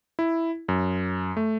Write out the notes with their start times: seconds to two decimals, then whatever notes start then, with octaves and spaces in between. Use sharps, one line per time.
0.19 E4
0.69 F#2
1.37 A3